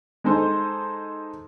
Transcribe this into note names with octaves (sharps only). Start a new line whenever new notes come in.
G#3 D#4 A4 C5 G#5